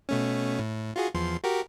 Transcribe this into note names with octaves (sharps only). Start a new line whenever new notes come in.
B2 A3 C#4
A2
F4 F#4 G#4
E2 F3 C6
F#4 G4 A#4